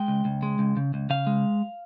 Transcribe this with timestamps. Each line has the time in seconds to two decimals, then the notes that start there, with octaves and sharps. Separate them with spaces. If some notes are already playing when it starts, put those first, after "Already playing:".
Already playing: G#3 G5
0.08 C#2
0.25 C#2
0.43 G#3
0.59 C#2
0.77 C#3
0.94 C#2
1.10 C#3 F5
1.27 G#3